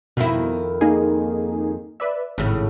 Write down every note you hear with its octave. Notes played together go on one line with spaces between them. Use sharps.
F2 B2 D#3 E4
A#3 D#4 G#4
B4 D5 E5
G#1 A2 C#3